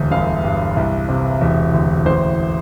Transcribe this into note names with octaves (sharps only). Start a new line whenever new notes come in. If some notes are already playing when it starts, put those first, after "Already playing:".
Already playing: E1 D2
G1 F5
G2
C2
C3
E1 E5
D2
A1 C5